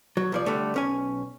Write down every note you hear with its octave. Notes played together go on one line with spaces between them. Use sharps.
F#3
C2 F3 D5
D3 G3 A3
B1 C#4 G#5